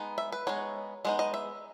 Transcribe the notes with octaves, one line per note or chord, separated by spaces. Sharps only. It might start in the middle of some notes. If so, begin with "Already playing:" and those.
Already playing: G#3 B3 D#4
E5
B4
G#3 B3 D#4 C#5
G#3 B3 D#4 D#5
D#5
E5